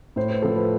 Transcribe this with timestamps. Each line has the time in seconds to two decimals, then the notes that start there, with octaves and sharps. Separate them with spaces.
0.16 A2 C5
0.30 B4
0.42 F3 A4
0.55 B4